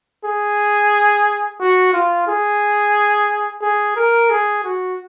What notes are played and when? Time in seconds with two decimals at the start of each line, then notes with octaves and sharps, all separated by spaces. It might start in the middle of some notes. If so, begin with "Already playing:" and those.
0.25 G#4
1.60 F#4
1.93 F4
2.27 G#4
3.62 G#4
3.96 A#4
4.30 G#4
4.64 F#4